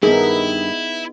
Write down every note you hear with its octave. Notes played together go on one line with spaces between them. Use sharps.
G2 D#3 B3 D#4 E4 G#4 A#4